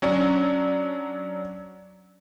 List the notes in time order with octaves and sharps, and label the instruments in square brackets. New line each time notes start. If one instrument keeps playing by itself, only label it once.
[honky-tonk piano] F#3 C#4 D4